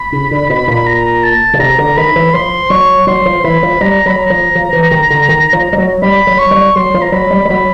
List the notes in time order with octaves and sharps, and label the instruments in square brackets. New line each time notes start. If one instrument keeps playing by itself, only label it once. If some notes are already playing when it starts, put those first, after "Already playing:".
Already playing: [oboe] B5
[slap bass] C#3
D3
B2
A#2
[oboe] A#5
A5
[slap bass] C#3
[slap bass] C3 [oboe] A#5
[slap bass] D3
[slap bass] D#3 [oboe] B5
[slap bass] E3
[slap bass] F3 [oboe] C6
[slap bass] F#3 [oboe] C#6
[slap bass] F#3 [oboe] C6
[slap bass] F3
[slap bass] E3 [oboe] B5
[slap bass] F3
[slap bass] G3 [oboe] A#5
[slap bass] F#3 [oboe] B5
[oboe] A#5
[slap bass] F3
F3
E3
D#3
D3
D#3
F3
G3
F#3
[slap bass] G3 [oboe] B5
[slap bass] F#3
[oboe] C#6
[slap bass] G3
[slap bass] F#3 [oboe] C6
[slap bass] F3
[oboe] A#5
[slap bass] F#3 [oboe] B5
[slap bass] G3
G3
[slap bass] F#3 [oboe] B5